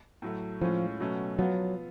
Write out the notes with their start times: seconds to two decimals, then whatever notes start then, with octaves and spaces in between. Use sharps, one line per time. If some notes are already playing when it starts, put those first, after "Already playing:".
0.22 A2 F#3 A3
0.61 A2 F3 G#3 C#4 F4
1.00 B2 F#3 A3 C#4
1.38 F3 F#3 B3 F4